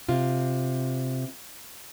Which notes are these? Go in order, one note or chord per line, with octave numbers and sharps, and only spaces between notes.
C3 F4